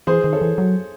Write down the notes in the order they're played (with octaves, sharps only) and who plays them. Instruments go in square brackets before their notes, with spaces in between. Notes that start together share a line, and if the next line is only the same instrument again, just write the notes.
[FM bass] E3 [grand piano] G#4 C5
[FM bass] D#3
[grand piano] A4 C#5
[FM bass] E3
F#3